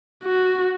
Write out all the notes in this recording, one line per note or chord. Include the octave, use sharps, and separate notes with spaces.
F#4